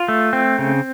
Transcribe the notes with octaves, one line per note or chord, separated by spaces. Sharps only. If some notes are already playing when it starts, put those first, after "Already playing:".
Already playing: F4
A3
C4
C#3